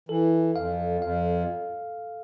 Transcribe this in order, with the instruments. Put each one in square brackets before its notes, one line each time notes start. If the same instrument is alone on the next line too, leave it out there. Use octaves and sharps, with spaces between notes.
[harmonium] E3 [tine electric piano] A4
[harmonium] F2 [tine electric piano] F5
[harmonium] F2 [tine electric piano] F5